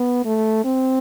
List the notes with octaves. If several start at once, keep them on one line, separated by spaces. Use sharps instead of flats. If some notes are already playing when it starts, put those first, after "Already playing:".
Already playing: B3
A3
C4